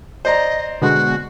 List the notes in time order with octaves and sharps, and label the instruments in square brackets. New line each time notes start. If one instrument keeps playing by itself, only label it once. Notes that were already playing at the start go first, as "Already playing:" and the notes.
[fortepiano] C5 D5 A#5 [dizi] D#5
[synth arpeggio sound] B2 D3 G#3 [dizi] F#4